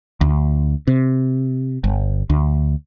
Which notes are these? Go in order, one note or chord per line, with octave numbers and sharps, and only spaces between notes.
D2
C3
G1
D2